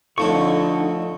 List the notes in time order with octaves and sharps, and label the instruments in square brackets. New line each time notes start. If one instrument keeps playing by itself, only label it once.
[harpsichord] F2 A3 C#5 [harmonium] D3 [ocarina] D#4 [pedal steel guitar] C#6